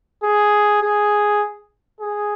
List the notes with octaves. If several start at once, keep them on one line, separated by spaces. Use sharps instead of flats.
G#4
G#4
G#4